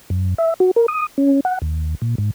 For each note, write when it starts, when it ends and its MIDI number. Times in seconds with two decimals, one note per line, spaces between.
0.10 0.34 42
0.38 0.54 76
0.60 0.71 66
0.76 0.86 70
0.88 1.07 87
1.18 1.40 61
1.45 1.59 78
1.62 1.95 39
2.02 2.15 46
2.18 2.31 44